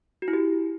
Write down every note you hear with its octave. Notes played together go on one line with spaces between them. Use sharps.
F#4
E4
G4